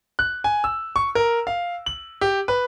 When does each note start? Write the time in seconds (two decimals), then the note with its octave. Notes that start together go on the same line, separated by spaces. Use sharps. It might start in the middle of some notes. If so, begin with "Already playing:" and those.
0.19 F#6
0.44 G#5
0.64 E6
0.96 C#6
1.15 A#4
1.47 F5
1.86 F#7
2.21 G4
2.48 B4